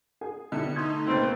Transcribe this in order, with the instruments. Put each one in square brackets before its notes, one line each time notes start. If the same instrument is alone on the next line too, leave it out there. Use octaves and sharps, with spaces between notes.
[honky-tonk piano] G#4 G#5
[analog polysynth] C2 B3 C#7 [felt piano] B2 D3 [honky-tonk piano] E4 G4
[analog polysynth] A3 D#4 [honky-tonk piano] C6 D#6 G#6
[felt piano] C#2 A#3 A6 [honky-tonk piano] B2 B4 [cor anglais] C4